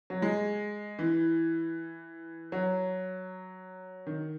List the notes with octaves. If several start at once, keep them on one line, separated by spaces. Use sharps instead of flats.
F#3
G#3
E3
F#3
D#3